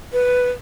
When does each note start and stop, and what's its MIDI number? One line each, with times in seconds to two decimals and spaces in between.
0.13 0.51 71